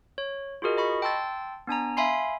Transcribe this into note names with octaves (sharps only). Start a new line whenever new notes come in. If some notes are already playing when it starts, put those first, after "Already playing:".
C#5
F4 F#4 G#4 A#4 D#5
D#5 B5 C#6
G5 A5 C6 E6 A6
B3 D4 G#5 A#5
E5 F5 G#5 B5 C6 C7